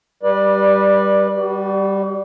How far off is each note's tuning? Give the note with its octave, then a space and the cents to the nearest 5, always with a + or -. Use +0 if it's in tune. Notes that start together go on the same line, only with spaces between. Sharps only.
G3 +0 B4 -25 D5 +15
G3 +0 F#4 +40